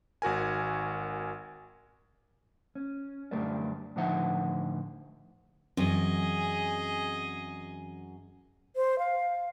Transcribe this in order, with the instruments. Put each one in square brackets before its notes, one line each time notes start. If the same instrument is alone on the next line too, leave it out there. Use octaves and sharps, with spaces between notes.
[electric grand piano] G#1 F#4 A#4 G#5
[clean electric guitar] C#4
F#2 D3 G3 A3 A#4 D5
A2 D3 F3 D#4 E5 F#5
[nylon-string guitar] F#2 [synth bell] E3 C4 [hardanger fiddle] G#4 D#5
[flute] C5
F5